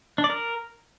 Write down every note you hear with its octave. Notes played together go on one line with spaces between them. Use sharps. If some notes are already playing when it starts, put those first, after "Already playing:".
D4
D5
A#4